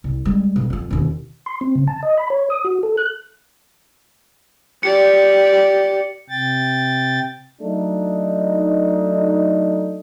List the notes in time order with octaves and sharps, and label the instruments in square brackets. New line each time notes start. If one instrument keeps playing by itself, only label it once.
[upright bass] C2
G3 G#3
B1
F2 F3
E1 D#2
[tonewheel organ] C6
C4
C#3
A5
D#5
B5
C#5
D#6
F#4
A4
F#6
[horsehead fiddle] G4 D5 [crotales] C#7
[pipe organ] C3 G5 A6
[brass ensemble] F#3 A3 D4 D#4